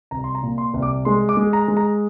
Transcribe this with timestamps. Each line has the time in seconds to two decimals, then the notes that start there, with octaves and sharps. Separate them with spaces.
0.11 C2 A#5
0.24 C6
0.35 A#5
0.43 A#2
0.58 C6
0.74 C2
0.82 D6
1.05 G#3 C6
1.29 D6
1.37 G#3
1.53 A#5
1.68 G#3
1.77 A#5